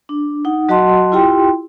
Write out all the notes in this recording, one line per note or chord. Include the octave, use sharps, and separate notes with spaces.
D4
D#4 F#5
F#3 F#4 D#5 F#5 A5 C6
E4 F4 G4 G5 C6